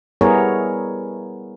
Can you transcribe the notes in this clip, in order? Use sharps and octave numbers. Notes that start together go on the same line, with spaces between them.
G3 B3 E4 G#4 A#4 C#5